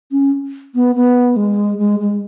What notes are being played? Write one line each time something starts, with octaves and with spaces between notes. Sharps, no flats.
C#4
B3
B3
G#3
G#3
G#3